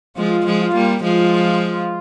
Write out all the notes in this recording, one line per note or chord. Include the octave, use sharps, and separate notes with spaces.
F3 G#3 F4
F3 G#3
F4
G3 A#3
F3 G#3 F4